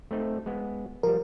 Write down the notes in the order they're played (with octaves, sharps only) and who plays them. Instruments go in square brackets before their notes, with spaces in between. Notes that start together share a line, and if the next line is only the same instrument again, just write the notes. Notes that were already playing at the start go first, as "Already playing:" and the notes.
[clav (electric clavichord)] A3 C4 D#4
G#3 B3
[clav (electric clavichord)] F3 G3 [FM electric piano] A#4